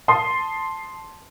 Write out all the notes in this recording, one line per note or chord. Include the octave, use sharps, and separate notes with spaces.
A5 C6 D#6